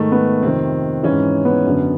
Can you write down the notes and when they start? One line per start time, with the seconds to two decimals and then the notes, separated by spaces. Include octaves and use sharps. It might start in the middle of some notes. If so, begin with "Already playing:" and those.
Already playing: G#2 D#3 A3
0.12 B3
0.42 F2 C3 D#3 C4
1.03 G#2 E3 C#4
1.45 B3
1.65 F#2 D3